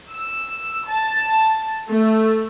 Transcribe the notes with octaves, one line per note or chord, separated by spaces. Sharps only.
E6
A5
A3